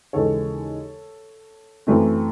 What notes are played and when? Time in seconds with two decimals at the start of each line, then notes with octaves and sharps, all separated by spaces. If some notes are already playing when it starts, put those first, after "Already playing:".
0.13 D#2 C#3 E3 G#3 A4 C#5
1.87 F#2 E3 A3 C4